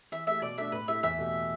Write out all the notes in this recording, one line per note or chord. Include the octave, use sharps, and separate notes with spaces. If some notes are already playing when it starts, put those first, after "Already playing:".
E3 E5
A3 G4 E5
B2 D5
A3 D4 E5
A2 B4
A3 E4 G4 E5
E2 E5
B2 A3 G4